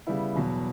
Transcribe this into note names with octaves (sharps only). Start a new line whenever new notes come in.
C#3 G3 B3 E4
E2 B2 F#3